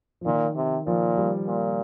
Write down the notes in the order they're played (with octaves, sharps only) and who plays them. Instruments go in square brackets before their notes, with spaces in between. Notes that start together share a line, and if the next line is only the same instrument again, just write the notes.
[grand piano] F3
[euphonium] A#2 [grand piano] D#3
[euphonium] C3
[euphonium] A#2 [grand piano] F3
[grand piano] G3
[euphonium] A#2